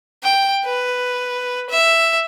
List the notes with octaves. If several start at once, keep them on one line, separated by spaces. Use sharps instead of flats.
G5
B4
E5